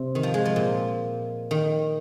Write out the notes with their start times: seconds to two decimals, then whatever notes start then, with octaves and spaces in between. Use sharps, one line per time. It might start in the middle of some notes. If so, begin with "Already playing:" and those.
Already playing: C3
0.15 D#3
0.23 F3
0.34 G#3
0.45 F3
0.56 A#2
1.51 D#3